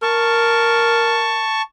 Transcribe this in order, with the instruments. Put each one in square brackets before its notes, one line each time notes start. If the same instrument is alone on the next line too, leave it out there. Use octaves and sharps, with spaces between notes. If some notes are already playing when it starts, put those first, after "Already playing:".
[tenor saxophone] A#4 [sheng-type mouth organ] A5 C#6